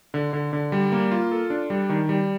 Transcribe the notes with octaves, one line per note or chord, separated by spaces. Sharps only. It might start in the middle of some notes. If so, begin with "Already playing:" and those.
D3
D3
D3
G3
A#3
F4
A4
D4
G3
D#3
G3